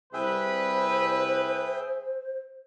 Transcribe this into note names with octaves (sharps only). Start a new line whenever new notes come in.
C2 G#4 B4 C5 E5 G5